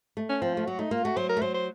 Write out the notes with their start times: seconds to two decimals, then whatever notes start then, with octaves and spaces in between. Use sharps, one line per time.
0.17 A3
0.29 C#4
0.42 F3 C4
0.54 A3 F4
0.66 F#3 F#4
0.79 A3 D#4
0.91 A#3 F4
1.04 A3 F#4
1.17 F#3 C5
1.29 A#4
1.37 A3
1.42 F#3 C5
1.54 C5